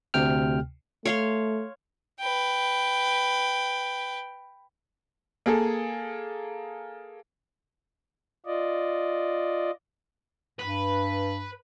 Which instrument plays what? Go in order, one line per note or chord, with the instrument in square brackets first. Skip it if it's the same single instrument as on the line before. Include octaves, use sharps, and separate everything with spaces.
[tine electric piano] D2 C3 G5 F6
[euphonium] A3 [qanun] C#5 F5 C6
[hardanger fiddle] B4 G5
[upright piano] A#3 G#4 A4
[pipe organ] F4 D5 D#5
[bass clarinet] G2 [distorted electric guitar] B4